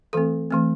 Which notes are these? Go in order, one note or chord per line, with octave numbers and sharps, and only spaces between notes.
E3 A3 C4 A4
E3 A3 C4